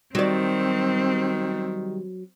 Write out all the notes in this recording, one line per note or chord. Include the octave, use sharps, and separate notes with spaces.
D#3 F#3 G3 C4 D5